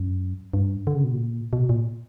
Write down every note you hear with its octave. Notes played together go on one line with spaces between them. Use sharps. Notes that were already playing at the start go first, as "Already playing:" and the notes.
Already playing: F#2
G2
D3
C#3
B2
A#2
B2
A#2